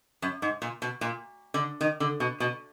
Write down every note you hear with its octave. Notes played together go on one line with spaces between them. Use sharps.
F#2
G#2
A#2
B2
A#2
D3
D#3
D3
B2
B2